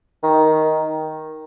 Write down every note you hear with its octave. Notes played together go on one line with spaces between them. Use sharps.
D#3